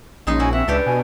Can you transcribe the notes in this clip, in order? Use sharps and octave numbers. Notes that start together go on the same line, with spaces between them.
A#1 G#3 C#4 D#4 G#4
E4 F#4 G#5
C4 E5 F#5
C#2 D4 G4 A4 B4
B2 G#5